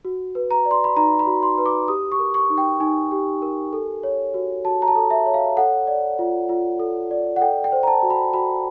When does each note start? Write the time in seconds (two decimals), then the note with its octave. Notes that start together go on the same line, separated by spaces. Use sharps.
0.05 F#4
0.35 B4
0.51 A#5
0.65 D5
0.71 C6
0.84 B5
0.96 D#4 A#5
1.19 B5
1.27 F#4
1.43 C6
1.58 B4
1.66 D6
1.88 G4 D#6
2.12 C#6
2.19 A#4
2.34 C#6
2.50 D#4
2.58 G5
2.80 D#4 G#5
3.12 G4
3.42 A#4
3.73 A4
4.03 C#5
4.34 F#4
4.65 F#4 A5
4.82 A#5
4.88 A5
4.95 A4
5.11 E5
5.26 C#5
5.34 F5
5.57 A4 F#5
5.87 D5
6.19 F4
6.49 F4
6.80 A4
7.11 D5
7.36 F#5
7.41 A4 G5
7.64 G5
7.72 C5
7.83 A#5
7.87 A5
8.03 F#4
8.10 B5
8.33 F#4 B5